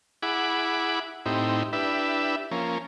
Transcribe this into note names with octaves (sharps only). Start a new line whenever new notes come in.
E4 G#4 F#5 B5 D6
A2 C4 D#4 E4 G4
D4 E4 G4 B4 E5
F3 A#3 C#4